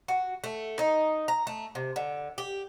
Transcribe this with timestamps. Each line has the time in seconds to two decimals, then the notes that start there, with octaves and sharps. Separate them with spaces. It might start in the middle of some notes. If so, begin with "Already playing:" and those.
0.08 F#4
0.44 A3
0.79 D#4
1.28 A#5
1.47 A3
1.75 C3
1.96 D3
2.38 G4